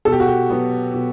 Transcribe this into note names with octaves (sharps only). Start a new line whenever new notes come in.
B2 A4
G4
F#4
G4
F#3 B3
B2